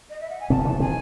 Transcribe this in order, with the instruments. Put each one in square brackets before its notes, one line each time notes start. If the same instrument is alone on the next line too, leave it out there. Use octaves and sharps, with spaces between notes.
[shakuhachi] D#5
E5
F#5
G#5
[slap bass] C3 D#3 [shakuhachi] A5
[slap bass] C#3 E3
[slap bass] C3 D#3 [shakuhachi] G#5